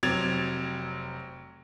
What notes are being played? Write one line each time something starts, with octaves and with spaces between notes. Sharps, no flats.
F1 F#3 C4 G#6 A6 F7